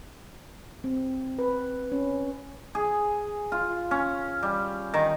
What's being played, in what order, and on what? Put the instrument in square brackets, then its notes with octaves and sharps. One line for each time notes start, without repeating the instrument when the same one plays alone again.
[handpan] C4
B4
C#4
[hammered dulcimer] G#4
F4
C#4
G3
D#3